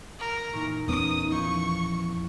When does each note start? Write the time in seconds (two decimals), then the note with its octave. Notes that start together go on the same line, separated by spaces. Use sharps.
0.19 A#4
0.53 A#2 E3 D#4 C#6
0.88 E2 B3 C#4 D#6
1.32 F3 E4 C#6 G6